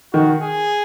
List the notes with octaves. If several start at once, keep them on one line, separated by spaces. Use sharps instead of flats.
D#3 F#4
G#4